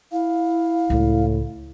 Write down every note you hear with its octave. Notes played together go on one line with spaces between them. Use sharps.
E4 F5
C#2 A2